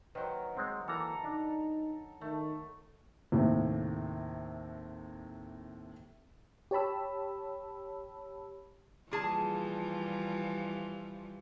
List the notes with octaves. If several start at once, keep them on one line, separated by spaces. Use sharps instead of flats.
D#3 F#3 B4 C5
G#3 C4
E3 A#3 A4 A#5
D4 D#4
D#3 A3
D#2 A2 C3
G4 C#5 A5 B5 E6
A#2 E3 F3 G3 G#4 A5